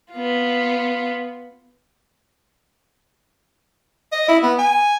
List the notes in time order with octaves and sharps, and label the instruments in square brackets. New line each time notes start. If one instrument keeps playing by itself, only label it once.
[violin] B3 F4
[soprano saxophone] D#5
E4
B3
G#5